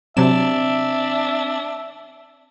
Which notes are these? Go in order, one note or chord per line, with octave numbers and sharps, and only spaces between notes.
C3 F#3 C4 D4 E5 E7